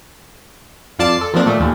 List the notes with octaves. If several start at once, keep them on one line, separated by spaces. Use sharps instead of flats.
F2 F4 D5 A5 C7
A4
D#3 F3 A#3 C4 D4
A#2 A3
D#2 A#2